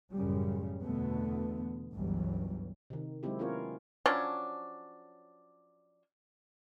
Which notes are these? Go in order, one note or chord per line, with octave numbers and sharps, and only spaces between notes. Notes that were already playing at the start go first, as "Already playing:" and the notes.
A1 F#2 C#3 G3
E2 B2 D3 A3 B3
G1 C#2 E3 F#3 G3
C3 D#3
F#3 G#3 A#3 C4 E4 G4
B3 C#4 E4 F4 A#4 C#5
F3 F#3 C#4 D4